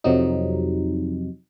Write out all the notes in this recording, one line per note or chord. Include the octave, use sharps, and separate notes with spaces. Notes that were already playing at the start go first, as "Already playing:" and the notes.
F2 C3 F#3 D#4